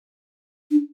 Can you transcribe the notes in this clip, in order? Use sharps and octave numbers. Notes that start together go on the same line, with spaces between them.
D4